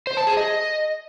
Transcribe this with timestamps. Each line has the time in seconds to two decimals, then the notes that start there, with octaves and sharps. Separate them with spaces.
0.07 C5
0.17 A5
0.27 G#4
0.37 D#5